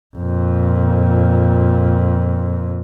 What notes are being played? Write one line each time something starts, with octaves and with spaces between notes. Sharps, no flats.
F2 A#2